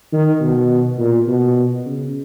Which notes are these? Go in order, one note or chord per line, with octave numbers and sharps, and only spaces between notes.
D#3
B2
A#2
B2
C#3